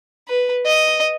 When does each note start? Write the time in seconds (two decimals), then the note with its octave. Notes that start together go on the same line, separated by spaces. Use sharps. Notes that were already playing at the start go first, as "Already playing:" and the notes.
0.29 B4
0.66 D#5